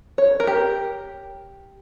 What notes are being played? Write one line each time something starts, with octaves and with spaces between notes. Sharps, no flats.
C#5
A#4
G4